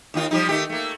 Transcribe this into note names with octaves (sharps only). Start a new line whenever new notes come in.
D#2 D#3 F4
F3 G3 D#4
D#3 A3 G4
A3 A#3